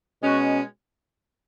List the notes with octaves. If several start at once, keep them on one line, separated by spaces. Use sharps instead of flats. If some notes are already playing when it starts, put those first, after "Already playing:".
B2 G#3 C#4 F#4